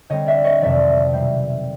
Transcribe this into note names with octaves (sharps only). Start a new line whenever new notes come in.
D3 G3 C4 C#5 D#5
D5 E5
C#5 D#5
F2 C3 D#3 F#3 D5 E5
B2 G3 C4